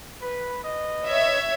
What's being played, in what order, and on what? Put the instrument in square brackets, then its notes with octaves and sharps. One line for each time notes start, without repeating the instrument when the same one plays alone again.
[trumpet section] B4
B4 D#5
[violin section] C#5 E5 G#6